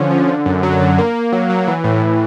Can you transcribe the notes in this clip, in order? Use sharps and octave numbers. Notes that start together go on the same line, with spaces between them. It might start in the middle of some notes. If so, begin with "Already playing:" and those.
Already playing: D3 F3 C#4
F3
D3
F#2
F#3
D3
A#3
A#3
F#3
F#3
E3
A2
A2